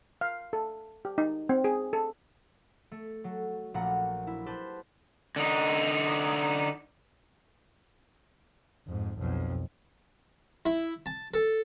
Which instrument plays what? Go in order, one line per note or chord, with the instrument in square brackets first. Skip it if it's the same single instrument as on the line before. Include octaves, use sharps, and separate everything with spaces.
[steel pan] F5
A4
G4
D#4
C4
G#4
A4
[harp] A3
F#3 A4
A#1 A#2 A3 F#5 A#5
E4
G4 B4 C5 A5 C6
[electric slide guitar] D3 D#4
[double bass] F2 G#2
B1 F2
[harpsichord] E4
A5
A4